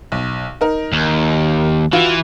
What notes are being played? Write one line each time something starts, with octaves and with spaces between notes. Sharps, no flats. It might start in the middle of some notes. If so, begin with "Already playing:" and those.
B1
D#4 A#4
D#2
E3 F4 F#4